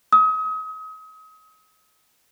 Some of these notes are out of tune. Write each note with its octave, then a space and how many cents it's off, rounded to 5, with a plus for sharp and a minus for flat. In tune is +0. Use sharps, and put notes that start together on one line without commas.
D#6 +35